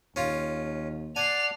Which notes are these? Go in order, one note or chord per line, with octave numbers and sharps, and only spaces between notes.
D#2 C#4 F4
D5 F#5 G#5 A5 C7 F7